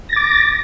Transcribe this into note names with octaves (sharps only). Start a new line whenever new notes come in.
D6 A6 A#6